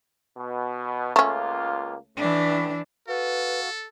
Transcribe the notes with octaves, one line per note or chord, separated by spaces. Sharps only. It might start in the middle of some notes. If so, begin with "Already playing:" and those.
B2
C#2 A3 A#3 C#4 F4
C#2 A2 E3 D4
F#4 A4 B4 F5